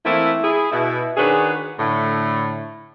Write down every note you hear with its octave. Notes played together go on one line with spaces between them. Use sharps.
E3 A3 A#3 C4 E4
E4 G#4
B2 E4
D#3 C#4 D4 F#4 G#4 B4
A2 D3 A3